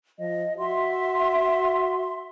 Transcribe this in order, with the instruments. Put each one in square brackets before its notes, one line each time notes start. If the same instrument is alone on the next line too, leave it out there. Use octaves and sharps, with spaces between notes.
[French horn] F3 [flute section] D#5
[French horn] F#4 [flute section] E5 C6